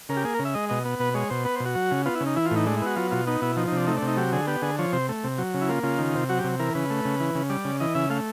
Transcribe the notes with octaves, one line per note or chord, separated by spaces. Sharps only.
C#3 A#4
G4
A#3 G#4
A#4
C#3
E5
G#3 D#5
B2 D#5
B3
B2 B4
G#3 C#5
B2 C5
B3 B4
C5
B2
F#4
F#3
C#3
B3 F4
E4
C#3
D#4
E3 E4
F4
A2
D#4
G#3 D4
E4
B3 F#4
F#3 F4
B2 F4
B3 D#4
B2 E4
F3 D#4
D#4
C3 D4
A3 D#4
D4
C3 D#4
F#3 G4
D3 G#4
B3 G4
D3 G#4
F3 C#5
C3 C5
A3
C3
F#3
C#3
E4
A#3 F4
C#3 F4
D#3
C3
F#3 F#4
G4
C3
E3 A#4
C#3 B4
A3
C#3
E3
C#3
G3 D5
C#3
E3 D#5
C#3 E5
A3 F5